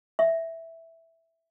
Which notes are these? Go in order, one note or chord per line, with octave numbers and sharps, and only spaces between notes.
E5